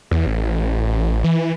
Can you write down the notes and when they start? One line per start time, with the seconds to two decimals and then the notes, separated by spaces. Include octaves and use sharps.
0.11 E2
0.27 A1
1.24 E3